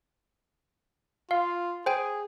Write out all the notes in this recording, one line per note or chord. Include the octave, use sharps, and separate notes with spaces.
F4 F5
G#4 C5 G5 G#5